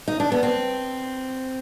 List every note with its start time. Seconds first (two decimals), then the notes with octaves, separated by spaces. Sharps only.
0.08 D#4
0.20 D4
0.32 B3
0.43 C4